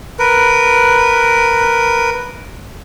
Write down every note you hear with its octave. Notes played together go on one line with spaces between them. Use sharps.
A#4 B4